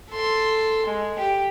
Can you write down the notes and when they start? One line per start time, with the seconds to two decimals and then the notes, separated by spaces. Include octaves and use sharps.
0.12 A4 C6
0.87 G#3
1.19 G4